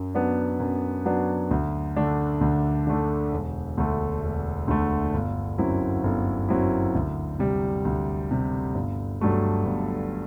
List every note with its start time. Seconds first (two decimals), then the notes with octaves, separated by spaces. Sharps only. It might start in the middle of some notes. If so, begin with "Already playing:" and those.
Already playing: F#2
0.15 F#3 B3 D4
0.60 F#2
1.05 F#3 B3 D4
1.51 D2
1.96 D3 A3 D4
2.41 D2
2.87 D3 A3 D4
3.32 E1
3.77 D2 D3 A3
4.22 E1
4.68 D2 D3 A3
5.14 G1
5.58 F#2 F#3 C4 E4
6.04 G1
6.49 F#2 F#3 C4 E4
6.95 D2
7.39 C3 G3
7.85 D2
8.31 C3 G3
8.75 G1
9.21 G2 F#3 A3
9.66 G1